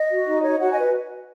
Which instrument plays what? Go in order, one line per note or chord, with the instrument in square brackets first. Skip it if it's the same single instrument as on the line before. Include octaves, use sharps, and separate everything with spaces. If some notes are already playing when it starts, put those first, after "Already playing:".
Already playing: [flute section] D#5
F#4
D#4
C#5
D#5
F#4 C#5 F#5
D#5 G#5
B4